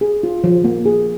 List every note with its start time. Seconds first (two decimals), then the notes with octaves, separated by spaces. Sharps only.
0.01 G#4
0.23 F4
0.44 F3
0.64 A#3
0.86 G#4